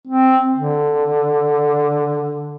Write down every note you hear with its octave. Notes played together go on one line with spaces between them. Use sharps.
C4
D3